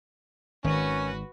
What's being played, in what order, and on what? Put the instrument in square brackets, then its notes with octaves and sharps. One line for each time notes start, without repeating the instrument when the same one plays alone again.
[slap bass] G#1 [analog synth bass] D#3 [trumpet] C#4 [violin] F#4 B4